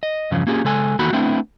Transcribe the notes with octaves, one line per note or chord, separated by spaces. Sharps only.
D#5
E2 G2 C#3 F3
A#3 C#4 F4 G4 G#4
C#3 G#3 A4 G#5
E2 D#3 A#3 F#4 A4 B5
A3 B3 C4 D4 E4